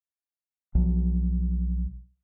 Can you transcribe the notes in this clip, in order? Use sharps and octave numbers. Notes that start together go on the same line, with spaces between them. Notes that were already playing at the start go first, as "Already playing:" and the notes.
B1 F3 F#3